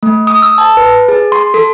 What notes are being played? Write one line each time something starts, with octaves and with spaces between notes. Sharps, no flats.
A3
D#6
E6
A5
B4
G#4
C6
A4